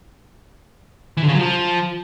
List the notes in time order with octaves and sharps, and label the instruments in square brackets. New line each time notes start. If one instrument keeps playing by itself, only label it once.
[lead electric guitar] E3
D3
C#3
F#3
F3